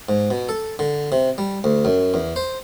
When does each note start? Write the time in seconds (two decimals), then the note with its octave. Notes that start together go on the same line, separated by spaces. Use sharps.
0.09 G#2
0.30 B2
0.49 A4
0.79 D3
1.12 C3
1.38 G3
1.64 D2
1.85 F#2
2.14 E2
2.36 C5